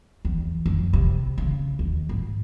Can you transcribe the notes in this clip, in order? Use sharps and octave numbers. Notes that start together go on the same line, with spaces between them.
E2
F2
C3
C#3
D#2
G#2